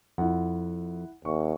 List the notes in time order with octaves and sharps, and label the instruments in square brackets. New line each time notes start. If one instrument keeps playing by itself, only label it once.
[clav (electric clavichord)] F2 [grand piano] E4 F#5
[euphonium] D#2 [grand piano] C#6